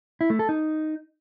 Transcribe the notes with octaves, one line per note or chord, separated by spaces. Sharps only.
E4
A3
A4
D#4